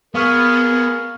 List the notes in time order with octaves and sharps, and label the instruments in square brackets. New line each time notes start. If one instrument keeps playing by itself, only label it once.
[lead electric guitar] B3 [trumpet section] G#4 [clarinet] A#4 [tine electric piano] F5 C#6 F6